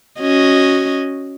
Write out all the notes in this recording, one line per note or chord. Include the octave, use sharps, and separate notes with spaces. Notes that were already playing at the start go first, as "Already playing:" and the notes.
C#4 F#4 D#5